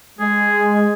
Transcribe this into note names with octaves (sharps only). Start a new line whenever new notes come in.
G#3 G#4